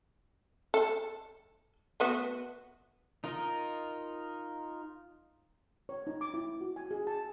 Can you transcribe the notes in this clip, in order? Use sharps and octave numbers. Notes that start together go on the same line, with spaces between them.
A4
A3 B3 F#4
D#4 F4 A#4 D#5
C#5
D#4
D6
E4
F#4
G#5
G#4
A5